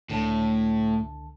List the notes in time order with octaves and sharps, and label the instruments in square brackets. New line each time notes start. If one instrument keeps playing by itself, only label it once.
[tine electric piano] C#2 D3 A5 [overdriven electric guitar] A2